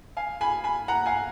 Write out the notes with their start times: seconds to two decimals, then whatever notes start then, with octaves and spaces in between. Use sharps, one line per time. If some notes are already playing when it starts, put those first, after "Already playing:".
0.17 F5 G#5
0.41 G#5 B5
0.64 G#5 B5
0.88 F#5 A#5
1.06 F5 G#5